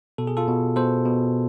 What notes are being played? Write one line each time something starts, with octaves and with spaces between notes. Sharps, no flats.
B2 A4
G#4
F4 A4
B2
B2 A4 C5
B2